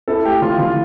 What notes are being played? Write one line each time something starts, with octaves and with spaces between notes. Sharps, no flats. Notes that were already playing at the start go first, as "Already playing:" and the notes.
E4 A4
A3 G4
E3 F4
E3 F4